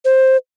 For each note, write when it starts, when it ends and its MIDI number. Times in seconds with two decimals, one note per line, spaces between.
0.05 0.37 72